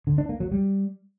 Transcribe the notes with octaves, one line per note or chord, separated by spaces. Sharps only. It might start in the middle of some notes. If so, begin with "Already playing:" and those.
D3
D4
A#3
F#3
G3